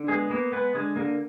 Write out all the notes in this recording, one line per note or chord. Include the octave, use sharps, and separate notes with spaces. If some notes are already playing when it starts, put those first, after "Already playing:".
Already playing: D3
G#3 B3 G#4
A#3 B3 A#4
G#3 B3 B4
D3 G#3 G#4
D3 A#3 A#4